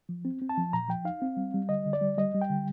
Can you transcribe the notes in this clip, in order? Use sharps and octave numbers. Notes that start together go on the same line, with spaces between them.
F3
C4
C4
A5
F3
A#2 A#5
F3 G5
D#4 F5
C4
G3
G3
D3 D#5
D3
D5
G3
G3 D#5
G3
G5
D3